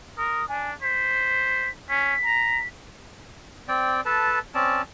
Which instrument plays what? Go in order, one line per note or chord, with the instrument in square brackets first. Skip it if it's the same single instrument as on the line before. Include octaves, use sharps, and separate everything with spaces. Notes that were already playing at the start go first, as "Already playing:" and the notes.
[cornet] A#4 [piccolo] D#6
[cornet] D4 [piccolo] G#5
[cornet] C5 [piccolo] B6
[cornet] C#4 [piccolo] B6
[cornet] A#5
[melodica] C4 D5 G5
A4 B4 A5
C4 C#4 D5 A5